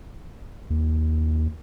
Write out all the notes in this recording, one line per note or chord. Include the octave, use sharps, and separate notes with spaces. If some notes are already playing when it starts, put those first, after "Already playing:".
D#2